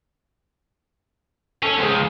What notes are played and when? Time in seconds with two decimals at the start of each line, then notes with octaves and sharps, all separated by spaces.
1.63 C#4 A4 C#5
1.78 C#2 C4 G#4